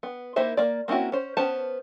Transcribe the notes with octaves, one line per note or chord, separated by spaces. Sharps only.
B3
A#3 D#4 E4 C5 E5
A#3 D5
A#3 C4 C#4 E4 F#4
C#4 C5
B3 C#4 C5 A5